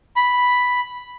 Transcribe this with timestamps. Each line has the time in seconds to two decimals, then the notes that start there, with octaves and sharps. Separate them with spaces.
0.16 B5